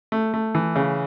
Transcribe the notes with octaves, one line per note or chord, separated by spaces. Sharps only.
A3
A3
E3
C#3